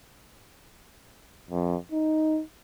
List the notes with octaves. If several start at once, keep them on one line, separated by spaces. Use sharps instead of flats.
F2
D#4